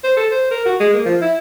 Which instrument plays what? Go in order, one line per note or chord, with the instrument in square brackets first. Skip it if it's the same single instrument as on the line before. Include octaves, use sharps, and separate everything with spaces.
[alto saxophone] C5
A4
C5
A#4
F#4
G#3
A#3
F3
E4